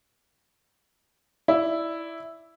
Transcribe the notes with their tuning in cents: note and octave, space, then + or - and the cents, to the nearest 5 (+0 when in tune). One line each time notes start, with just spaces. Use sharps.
E4 +0 D5 +0